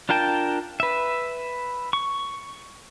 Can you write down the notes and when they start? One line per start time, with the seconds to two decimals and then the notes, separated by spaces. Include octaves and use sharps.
0.09 D4 F4 A#4 G5 A5
0.80 B4 E5
1.93 C#6